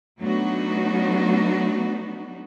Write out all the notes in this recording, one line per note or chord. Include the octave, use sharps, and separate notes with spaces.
F#3 A3 B3 D4 D#4 F#4